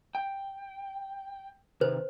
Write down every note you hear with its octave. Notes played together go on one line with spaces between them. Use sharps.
G5
C3 D#3 B4 C5